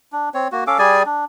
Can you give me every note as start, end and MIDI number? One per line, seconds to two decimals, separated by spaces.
0.12 0.29 62
0.34 0.48 60
0.34 0.48 73
0.52 0.64 58
0.52 0.64 66
0.67 0.78 61
0.67 0.78 69
0.67 0.78 77
0.67 0.78 86
0.79 1.03 55
0.79 1.03 68
0.79 1.03 74
0.79 1.03 80
1.06 1.25 62